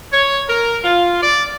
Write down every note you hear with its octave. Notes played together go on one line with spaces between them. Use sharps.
C#5
A#4
F4
D5